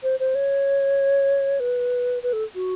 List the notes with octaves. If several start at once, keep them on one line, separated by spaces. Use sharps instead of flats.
C5
C5
C#5
B4
B4
A4
F#4